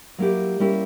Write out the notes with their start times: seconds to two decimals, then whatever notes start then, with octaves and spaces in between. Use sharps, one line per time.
0.18 F#3 A#3 E4 G4
0.59 G3 A#3 C#4 E4 G4